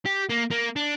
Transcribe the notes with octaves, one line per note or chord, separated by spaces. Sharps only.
G4
A#3
A#3
D4